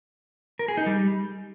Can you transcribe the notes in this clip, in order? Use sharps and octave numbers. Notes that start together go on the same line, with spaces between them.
A#4
G#4
D#4
G3